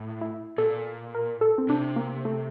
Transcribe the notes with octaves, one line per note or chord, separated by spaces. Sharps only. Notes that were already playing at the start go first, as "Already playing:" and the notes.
Already playing: A2
E4
A#2 A4
A#4
A4
C4
C3 D4
A#3
A3